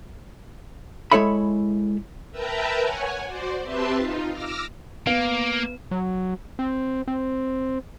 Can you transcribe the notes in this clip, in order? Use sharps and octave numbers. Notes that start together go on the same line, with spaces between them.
G#3 E4 A4 C#5 E5 B5
A#4 B4 E5 G5 A5 A#5
C#5 F#5 G#5
F#4 C5 D5
C4 G4 B4 E5 A5 C6
D#4 F4
D6 E6 F6 A#6
A#3 B3 F5
F#3
C4
C4